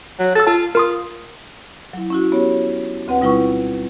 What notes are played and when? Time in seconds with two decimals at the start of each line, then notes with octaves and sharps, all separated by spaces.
0.19 F#3
0.35 A4 E6 A6
0.47 F4 A5
0.75 F4 A#4 C6 D#6
1.93 F#3 E4
2.10 C#4 E4 F#4
2.32 B3 G4 C#5
3.08 D2 C4 B4 F#5
3.21 B2 G3 E4 F4 B4 C#6